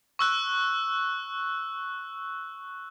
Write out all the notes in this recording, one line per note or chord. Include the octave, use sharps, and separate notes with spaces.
C#6 E6 F#6